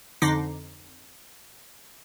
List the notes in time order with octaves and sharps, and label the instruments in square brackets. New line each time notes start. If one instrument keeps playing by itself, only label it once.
[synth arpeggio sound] F2 D3 D#4 D6 A#6 C7